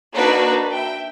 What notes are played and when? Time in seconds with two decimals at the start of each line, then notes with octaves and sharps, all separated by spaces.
0.13 A#3 D4 D#4 F#4 A#4 B4
0.70 E5 G5